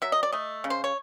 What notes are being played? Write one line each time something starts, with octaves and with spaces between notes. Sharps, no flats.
F#3 E5
D#5
D5
A3 D#5
C#3
C5
C#5